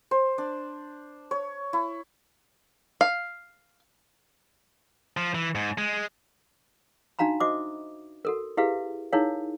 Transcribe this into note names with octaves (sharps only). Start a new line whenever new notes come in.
C5
D4
C#5
E4
F5
F3
E3
G#2
G#3
D4 D#4 F#4 F5 A#5 B5
F#4 C5 D#5 E5 D6 D#6
F#4 A4 A#4
E4 G4 G#4 B4 E5 F5
D#4 E4 G#4 A#4 C#5 F5